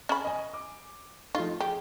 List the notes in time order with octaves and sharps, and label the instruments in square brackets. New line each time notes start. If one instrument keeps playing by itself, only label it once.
[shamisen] C#4 B5
[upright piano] D#5 G#5
D6
[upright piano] F3 A3 D#4 [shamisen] F4
[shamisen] G4 [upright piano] G#4